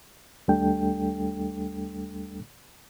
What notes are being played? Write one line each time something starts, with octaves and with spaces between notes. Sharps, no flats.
D#2 G3 A3 D4 A4 G5